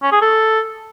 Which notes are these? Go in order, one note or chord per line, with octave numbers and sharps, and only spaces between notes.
C#4
G#4
A4